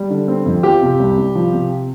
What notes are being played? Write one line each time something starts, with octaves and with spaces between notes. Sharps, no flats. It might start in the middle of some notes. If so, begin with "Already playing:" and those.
Already playing: G3
D3
C4
F2
F3 G4
C3
C2
C2
F3
C3